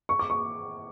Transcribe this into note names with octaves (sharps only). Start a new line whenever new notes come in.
C#6
D6
C#6